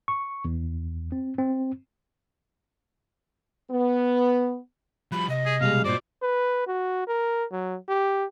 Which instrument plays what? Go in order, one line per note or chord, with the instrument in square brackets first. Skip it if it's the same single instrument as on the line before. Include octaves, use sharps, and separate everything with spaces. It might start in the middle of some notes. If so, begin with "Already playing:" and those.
[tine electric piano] C#6
E2
C4
C4
[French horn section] B3
[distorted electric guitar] F3 G3 [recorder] B5
[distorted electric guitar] C2 C3 [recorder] D#5
[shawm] G#4
[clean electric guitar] B2 G3 G#3 [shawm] F5
[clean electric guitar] G2 A#2 [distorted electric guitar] F#4 D#5 [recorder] C5 [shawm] D5
[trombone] B4
F#4
A#4
F#3
G4